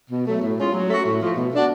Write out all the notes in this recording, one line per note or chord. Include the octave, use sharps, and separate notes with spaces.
B2
F#3 A3
A2
G#3 C#4 F4
F#3
A3 C#4 F#4
A2
F3 A3
B2
A3 D4 F#4